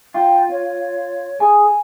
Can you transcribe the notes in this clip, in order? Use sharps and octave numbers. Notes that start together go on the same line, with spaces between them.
F4 G5
C#5
G#4 G#5